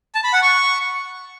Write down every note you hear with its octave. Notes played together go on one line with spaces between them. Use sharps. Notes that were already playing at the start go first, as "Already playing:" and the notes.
A5
B5
F#5
C#6